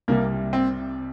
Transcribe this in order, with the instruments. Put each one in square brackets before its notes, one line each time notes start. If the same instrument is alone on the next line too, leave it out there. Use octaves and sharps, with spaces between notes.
[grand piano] C2 C3 G3 [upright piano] A#3
[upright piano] C4